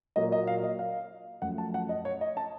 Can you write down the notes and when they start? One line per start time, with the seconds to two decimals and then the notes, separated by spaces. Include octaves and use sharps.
0.16 A#2 F#3 A#3 D#5
0.32 D#5
0.47 F5
0.63 D#5
0.79 F5
1.42 F#2 F3 A3 F#5
1.58 A5
1.74 F#5
1.89 D#5
2.05 C#5
2.21 D#5
2.37 A5